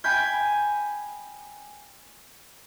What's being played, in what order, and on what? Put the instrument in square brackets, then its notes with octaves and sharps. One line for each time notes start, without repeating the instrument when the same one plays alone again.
[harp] G5 G#5 B5 G6